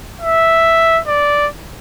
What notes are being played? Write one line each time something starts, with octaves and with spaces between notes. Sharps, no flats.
E5
D5